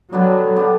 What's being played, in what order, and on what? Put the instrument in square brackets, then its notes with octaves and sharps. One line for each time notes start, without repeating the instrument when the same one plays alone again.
[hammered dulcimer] D3 G3 B3 D4 [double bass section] F#3
[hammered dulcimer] D3 G3 B3 D4